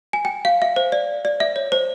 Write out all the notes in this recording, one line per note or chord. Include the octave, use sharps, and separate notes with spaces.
G#5
G5
F5
E5
C5
D5
D5
E5
C#5
C5